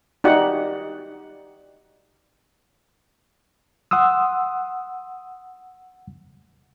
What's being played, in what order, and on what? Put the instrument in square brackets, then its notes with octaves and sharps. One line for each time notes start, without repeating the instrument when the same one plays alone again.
[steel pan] D#4 F#4 G4 D5 F#5
[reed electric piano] F#5 C6 D#6 E6